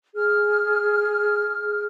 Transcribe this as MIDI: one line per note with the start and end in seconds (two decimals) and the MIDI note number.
0.16 1.86 68
0.16 1.86 89